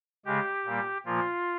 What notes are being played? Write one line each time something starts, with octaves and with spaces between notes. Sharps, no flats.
C#3 G#3 G4
A#2 G3 A#3
A#2 F3 A#3 F4